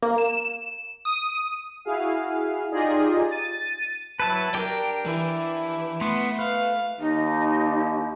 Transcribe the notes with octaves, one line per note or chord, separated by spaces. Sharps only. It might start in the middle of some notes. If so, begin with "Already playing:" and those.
A#3
E7
D#6
E4 F#4 G#4 F5
D#4 F4 G4 G#4 D5 D#5
A6 D#7
F#3 E4 B4 A5
D4 G4 A#4 G5
E3 E4
A3 B3 C6
B4 F5
D#2 D#4